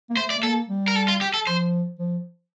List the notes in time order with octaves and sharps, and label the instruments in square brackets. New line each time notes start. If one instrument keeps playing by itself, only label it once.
[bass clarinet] A#3
[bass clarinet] A3 [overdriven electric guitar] C5
[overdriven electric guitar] D5
[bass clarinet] A3
[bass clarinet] A#3 [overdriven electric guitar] A4
[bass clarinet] G3
[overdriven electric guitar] A#4
A4
F4
G4
A4
[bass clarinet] F3 [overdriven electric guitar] C5
[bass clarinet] F3